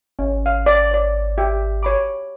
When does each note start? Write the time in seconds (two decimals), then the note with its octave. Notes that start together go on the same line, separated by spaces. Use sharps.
0.19 G#1 C#4
0.46 F5
0.66 D5
0.91 C#5 D5
1.38 G4 E5
1.83 C#5 B5 D6